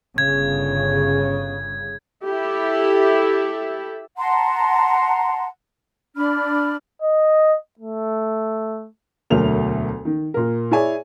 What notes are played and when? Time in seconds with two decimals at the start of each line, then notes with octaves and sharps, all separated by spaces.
0.18 G1 C#3 G#6
2.26 E4 G4 A4 E5
4.18 F#5 A5 A#5 C6
6.15 D4 B5 F6
7.02 D#5
7.79 A3
9.30 E1 D2 F#3 A3 A#4 F7
10.05 D#3
10.34 A#2 A#4
10.71 E4 G#4 C#5 D5 G#5